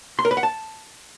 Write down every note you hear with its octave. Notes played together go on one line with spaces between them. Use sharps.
C6
A#4
B4
F#5
A5